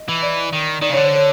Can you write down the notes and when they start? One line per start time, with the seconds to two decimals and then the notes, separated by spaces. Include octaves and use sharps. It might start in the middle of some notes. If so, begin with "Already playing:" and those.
Already playing: D#5
0.09 E3
0.23 D5
0.53 D#3
0.81 D#3 D5
0.90 C#3
0.93 D3 C#5
1.05 C5
1.15 C#5